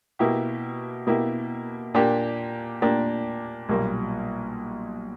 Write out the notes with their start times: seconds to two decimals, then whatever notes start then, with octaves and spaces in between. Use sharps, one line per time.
0.19 B2 A#3 E4 G4
1.07 B2 A#3 E4 G4
1.94 A#2 A#3 D4 G4
2.82 A#2 A#3 D4 G4
3.69 B1 A#2 G3 A#3